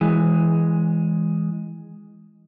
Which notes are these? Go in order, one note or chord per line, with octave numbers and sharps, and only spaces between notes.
E3 G#3